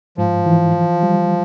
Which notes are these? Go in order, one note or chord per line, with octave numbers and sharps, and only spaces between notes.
G#2 F3
E3
E3
G3